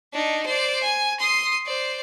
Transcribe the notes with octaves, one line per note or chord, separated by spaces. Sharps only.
D4 D#4
C5 D5
G#5
C6 D#6
C5 D5